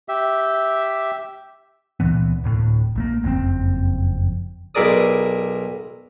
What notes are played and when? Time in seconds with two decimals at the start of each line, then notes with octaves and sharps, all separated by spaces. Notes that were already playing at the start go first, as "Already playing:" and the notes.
0.09 G4 E5
2.00 C#2 A#2 E3 B3
2.44 D1 A2
2.95 A#1 A3 A#3
3.23 F#1 F2 C3 C4
4.75 B1 E4 G#4 A#4 D5 D#6